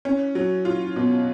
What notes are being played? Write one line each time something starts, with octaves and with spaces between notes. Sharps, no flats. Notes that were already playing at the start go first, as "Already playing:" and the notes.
C#4
F#3
F4
B2